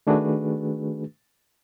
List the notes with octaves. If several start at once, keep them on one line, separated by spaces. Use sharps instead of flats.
D#3 A3 D4 F#4 G#4 B4